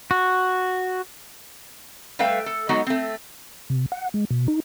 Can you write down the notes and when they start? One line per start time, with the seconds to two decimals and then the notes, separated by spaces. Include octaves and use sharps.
0.11 F#4
2.19 G3 A3 B4 F5 G5
2.46 A4
2.69 F#3 G#3 B3 D#4 F#4
2.87 A3 C4
3.70 C3
3.92 F#5
4.14 G#3
4.31 B2
4.48 D#4